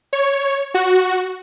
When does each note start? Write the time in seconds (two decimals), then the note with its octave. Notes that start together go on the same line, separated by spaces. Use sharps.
0.13 C#5
0.74 F#4